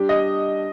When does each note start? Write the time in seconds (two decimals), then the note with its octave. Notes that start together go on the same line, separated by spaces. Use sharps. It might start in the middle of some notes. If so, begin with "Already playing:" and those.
Already playing: G3 D4 G4
0.09 D#5